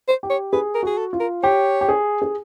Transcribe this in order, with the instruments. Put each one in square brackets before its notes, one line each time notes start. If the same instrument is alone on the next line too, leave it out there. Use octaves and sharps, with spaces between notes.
[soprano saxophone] C5
[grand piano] G4
[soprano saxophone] C#5
[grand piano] G#4 [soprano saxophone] B4
[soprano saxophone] A#4
[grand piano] F#4 [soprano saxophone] G#4
[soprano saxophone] A4
[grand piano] F4
[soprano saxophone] A#4
[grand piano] G4 [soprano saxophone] C#5
[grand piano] G4
G#4
G#4